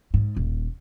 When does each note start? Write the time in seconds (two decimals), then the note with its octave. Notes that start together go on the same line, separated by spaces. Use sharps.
0.14 G#2
0.36 D#1